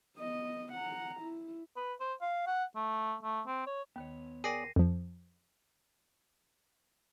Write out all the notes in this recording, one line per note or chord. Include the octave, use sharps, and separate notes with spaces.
B3 D#5
F#5 A#5
E4
B4
C5
F5
F#5
A3
A3
C4
C#5
D#2 D#3 B3 C#5
G#4 A#4 D5 G5 G#5 A#6 C7 D#7
F2 F3